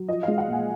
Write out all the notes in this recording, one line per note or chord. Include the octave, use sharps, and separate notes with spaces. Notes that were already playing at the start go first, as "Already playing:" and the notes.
Already playing: F#3
F3 D#5
G#3 F5
F#5
A#2 G#5